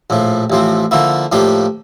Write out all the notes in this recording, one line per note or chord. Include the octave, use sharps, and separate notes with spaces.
A#1 A2 F3
A1 A2 F3 C4
D3 F3 A#3 E4
A2 F3 A#3 D4 G4